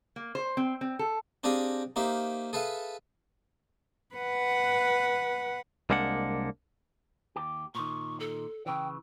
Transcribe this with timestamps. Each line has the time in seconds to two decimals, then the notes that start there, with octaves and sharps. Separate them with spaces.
0.16 A#3
0.35 C5
0.57 C4
0.81 C4
0.99 A4
1.44 C4 D4 G4 G#4 F5 A#5
1.96 A#3 D#4 G4 C5 E5 F5
2.53 G#4 A4 B4 E5 F5
4.15 B4 F#5
5.90 C2 G#3 A#3 D4 F#5
7.36 D#2 G4
7.75 A#2 D#3 C#6
8.20 A4
8.66 C#3 E3 G5